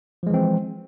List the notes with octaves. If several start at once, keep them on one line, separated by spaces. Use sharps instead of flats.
E3 F3 G#3 C4